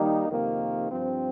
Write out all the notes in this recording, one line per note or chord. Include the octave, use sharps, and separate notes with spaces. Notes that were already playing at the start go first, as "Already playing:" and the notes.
Already playing: D#3 G3 A#3 D#4
F2 C3 D#3 A#3
G2 F3 C4